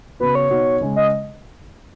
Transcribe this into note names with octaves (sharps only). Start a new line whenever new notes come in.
C#3 B3 F#4 B4
C#5
B2 B3 D#4 F#4
C#3 G#3 C#4
D#5